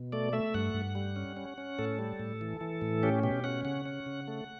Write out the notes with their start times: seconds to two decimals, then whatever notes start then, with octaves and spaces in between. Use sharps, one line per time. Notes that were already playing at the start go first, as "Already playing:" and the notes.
Already playing: B2
0.12 A3 D5
0.33 A3 E5
0.54 G2 F#5
0.74 G2
0.95 G3
1.16 C#4
1.37 C#4
1.58 C#4
1.79 A2 A4
1.99 G3
2.20 A2
2.41 E3
2.61 E3
2.81 A2
3.03 C#4 G4
3.23 B2 G4
3.44 C#4 F#5
3.65 C#3 F#5
3.86 C#4
4.06 C#3
4.28 A3